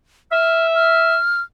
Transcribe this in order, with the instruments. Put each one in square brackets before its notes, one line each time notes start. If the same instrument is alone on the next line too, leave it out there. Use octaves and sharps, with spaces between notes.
[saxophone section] E5 [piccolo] F6
[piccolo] F6